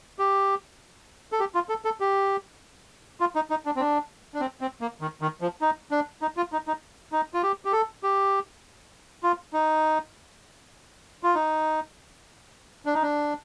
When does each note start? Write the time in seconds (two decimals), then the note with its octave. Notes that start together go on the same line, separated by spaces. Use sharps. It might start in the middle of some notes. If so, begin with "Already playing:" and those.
0.19 G4
1.32 A4
1.40 G4
1.55 F4
1.69 A4
1.85 A4
2.00 G4
3.20 F4
3.35 D#4
3.50 D#4
3.66 D4
3.76 C4
3.80 D4
4.34 D4
4.40 C4
4.61 C4
4.81 A#3
5.01 D#3
5.21 D#3
5.41 F3
5.61 D#4
5.91 D4
6.22 D#4
6.37 F4
6.53 D#4
6.68 D#4
7.12 D#4
7.34 F4
7.43 G4
7.65 G4
7.73 A4
8.03 G4
9.23 F4
9.53 D#4
11.23 F4
11.35 D#4
12.86 D4
12.94 D#4
13.02 D4